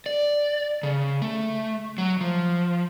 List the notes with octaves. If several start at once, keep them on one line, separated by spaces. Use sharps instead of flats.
D5
C#3
A3
F#3
F3